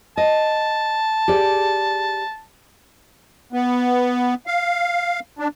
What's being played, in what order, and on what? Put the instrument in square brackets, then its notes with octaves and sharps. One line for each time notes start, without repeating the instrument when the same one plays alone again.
[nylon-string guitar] D#5 [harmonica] A5
[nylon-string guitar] G4 G#4 D5
[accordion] B3
F5
D4